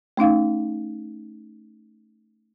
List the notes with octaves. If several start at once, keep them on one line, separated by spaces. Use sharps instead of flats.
A3 C#4 D#4 F5